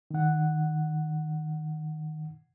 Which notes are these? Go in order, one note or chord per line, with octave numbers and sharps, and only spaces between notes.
D#3 F#5